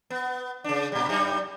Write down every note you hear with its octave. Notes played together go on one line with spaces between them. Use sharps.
B3
C#3 D4
A#2 G3
F#2 G3 D#4